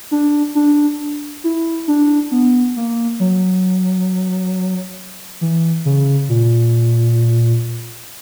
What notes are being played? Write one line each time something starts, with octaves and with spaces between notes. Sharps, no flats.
D4
D4
E4
D4
B3
A#3
F#3
E3
C#3
A#2